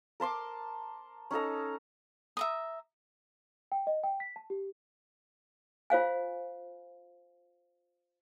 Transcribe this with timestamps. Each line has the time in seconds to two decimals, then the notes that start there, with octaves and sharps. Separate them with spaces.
0.20 A#4 A5 C6 D6
1.31 C#4 D#4 A4 A#5
2.37 E5 A#5 D#6
3.72 G5
3.87 D#5
4.04 G5
4.20 B6
4.36 A5
4.50 G4
5.90 F4 C5 F5 G#5